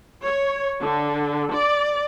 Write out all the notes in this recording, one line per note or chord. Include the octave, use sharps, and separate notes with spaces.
C#5
D3
D5